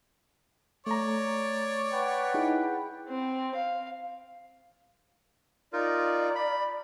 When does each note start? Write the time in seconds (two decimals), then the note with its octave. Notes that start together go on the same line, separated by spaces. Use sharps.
0.87 A3 C#5 D5 A#5
1.93 B4 F#5 G5
2.34 D#4 E4 G#4
3.08 C4
3.55 F5
5.73 D#4 F4 A#4 D5
6.35 B5